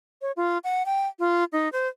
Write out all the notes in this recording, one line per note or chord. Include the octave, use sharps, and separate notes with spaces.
C#5
F4
F#5
G5
F4
D#4
C5